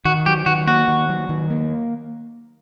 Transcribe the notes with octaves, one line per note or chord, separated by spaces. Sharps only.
D#3 F#4
F#3 G4
D#3 F#4
A#3 F#4
D#3
F#3
D#3
A#3